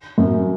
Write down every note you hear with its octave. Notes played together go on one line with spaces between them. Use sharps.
F#2